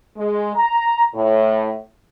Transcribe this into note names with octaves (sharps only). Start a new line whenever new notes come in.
G#3
A#5
A2